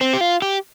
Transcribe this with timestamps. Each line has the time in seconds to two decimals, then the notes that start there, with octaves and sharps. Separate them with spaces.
0.01 C4
0.13 G4
0.21 F4
0.42 G4